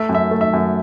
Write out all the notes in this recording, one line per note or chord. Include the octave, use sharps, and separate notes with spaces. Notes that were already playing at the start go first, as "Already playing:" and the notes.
Already playing: A3 E5
F#2
E5
A3
E5
F#2